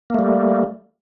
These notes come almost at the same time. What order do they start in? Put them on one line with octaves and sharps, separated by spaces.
A#3 A3 G3